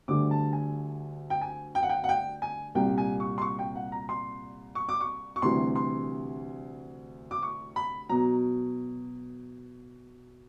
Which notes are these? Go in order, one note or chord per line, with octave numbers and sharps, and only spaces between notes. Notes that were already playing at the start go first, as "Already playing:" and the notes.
D2 D3 G3 D6
A5
G#5
G5
G#5
G5
F#5
G5
F#5
G5
G#5
C2 A#2 G3 G5
G#5
C#6
C6
C#6
G5
F#5
A#5
C6
C#6
D6
C#6
C#6
D2 C3 E3 G3 C6
C6
D6
C#6
B5
B2 F#3 A#5